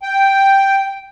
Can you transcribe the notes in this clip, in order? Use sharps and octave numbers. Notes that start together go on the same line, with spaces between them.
G5